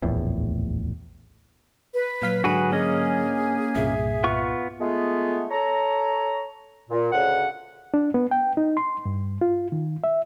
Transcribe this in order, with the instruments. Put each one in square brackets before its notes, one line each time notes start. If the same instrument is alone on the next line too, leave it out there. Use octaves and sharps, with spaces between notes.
[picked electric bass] D1 A#1 E2 A2
[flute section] B4
[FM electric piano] A#2 F5 B6 [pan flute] F#3
[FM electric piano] G#2 D3 [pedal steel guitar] F#4 G#4 B4 [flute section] B5
[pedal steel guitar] A#3 C#4 D#5 [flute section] G#4
[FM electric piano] C2 G2 A#2 [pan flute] E5
[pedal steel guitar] B3 F4 C#6
[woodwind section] G#3 A3 B3 F4
A4 C#5 A#5
A#2
D2 C#3 F#5
[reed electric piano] D4
B3
G5
D#4
C6
G2
F4
D#3
E5